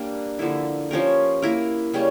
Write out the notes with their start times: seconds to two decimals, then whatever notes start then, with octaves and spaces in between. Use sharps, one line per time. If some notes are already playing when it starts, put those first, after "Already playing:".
Already playing: G3 A#3 D4
0.39 D3 F3 A#3 E4
0.91 F3 C#4 G4 A#4
1.42 A#3 E4 A#4
1.93 C#3 G3 A#3 C#4